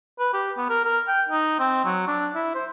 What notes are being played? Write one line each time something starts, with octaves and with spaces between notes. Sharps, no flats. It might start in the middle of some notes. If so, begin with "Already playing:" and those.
B4
G4
B3
A#4
A#4
G5
D#4
C4
F#3
D4
E4
C5